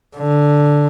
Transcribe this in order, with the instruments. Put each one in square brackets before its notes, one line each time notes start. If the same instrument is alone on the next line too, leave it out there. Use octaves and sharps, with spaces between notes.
[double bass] D3